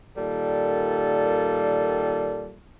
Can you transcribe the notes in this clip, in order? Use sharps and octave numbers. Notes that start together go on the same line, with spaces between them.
A#2 D#3 G3 A4